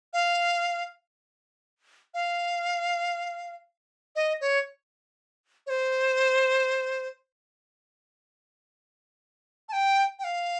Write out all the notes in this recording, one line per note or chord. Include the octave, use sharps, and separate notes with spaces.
F5
F5
D#5
C#5
C#5
C5
A5
G5
G5
F5